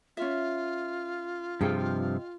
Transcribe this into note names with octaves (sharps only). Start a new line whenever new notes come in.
C#4 F4 E5
G2 C3 F3 G#4 D#5 G5